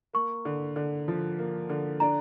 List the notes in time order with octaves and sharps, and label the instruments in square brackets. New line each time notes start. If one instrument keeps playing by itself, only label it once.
[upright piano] A#3 [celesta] C#6
[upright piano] D3
D3
F3
A#3
D3
[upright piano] D4 [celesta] A#5